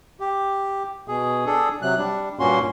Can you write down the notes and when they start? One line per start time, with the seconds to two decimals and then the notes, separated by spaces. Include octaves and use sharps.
0.20 G4
1.08 B2 G#4
1.46 D4 G#4 A4
1.82 C3 F#3 F#6
1.98 G3 D4
2.39 G2 A#2 A#3 C#4 F#4 C6